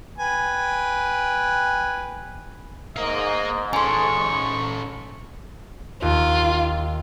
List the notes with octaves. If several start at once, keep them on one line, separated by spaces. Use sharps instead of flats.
B4 G5 G#5
G#2 A#4 D#5 F5
C#4 A4 G#5 C6 C#6
D#2 F4